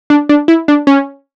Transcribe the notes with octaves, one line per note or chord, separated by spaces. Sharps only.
D4
D4
E4
D4
C#4